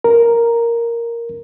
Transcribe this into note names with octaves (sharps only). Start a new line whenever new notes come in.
A#4